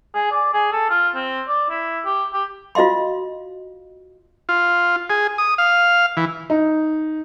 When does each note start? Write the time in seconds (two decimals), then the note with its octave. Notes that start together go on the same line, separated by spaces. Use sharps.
0.14 G#4
0.31 D5
0.54 G#4
0.73 A4
0.90 F4
1.16 C4
1.48 D5
1.70 E4
2.06 G4
2.34 G4
2.75 F4 F#4 D#5 F5 C6
4.49 F4
5.10 G#4
5.38 D#6
5.58 F5
6.17 E3
6.50 D#4